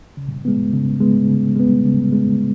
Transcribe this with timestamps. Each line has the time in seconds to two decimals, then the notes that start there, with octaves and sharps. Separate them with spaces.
0.17 C#3
0.45 G#3 B3
0.73 C#3
1.01 G#3 B3
1.29 C#3
1.56 G#3 B3
1.85 C#3
2.12 G#3 B3